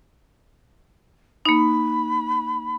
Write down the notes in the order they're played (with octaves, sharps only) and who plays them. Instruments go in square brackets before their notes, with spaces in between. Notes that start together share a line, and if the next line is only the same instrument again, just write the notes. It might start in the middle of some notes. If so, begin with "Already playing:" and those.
[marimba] A#3 D#4 [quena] B5